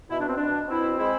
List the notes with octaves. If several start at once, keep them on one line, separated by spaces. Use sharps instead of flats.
B2 E4
D4
C4
B2 D4
C4 E4
G#3 E4